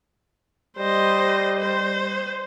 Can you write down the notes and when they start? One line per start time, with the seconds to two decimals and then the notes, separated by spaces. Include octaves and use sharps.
0.78 G3 C5 D#5
1.59 C5